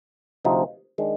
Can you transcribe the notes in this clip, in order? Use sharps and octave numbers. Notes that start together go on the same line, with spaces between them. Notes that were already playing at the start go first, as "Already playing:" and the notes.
D2 C3 F3 C4 D#4
D#3 G#3 D4